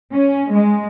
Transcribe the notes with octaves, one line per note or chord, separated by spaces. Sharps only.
C#4
G#3